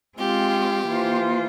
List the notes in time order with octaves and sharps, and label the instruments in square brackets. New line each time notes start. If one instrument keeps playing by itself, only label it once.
[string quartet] G#3 C4 F4 [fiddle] G4
[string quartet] E3 A#3 F4 C5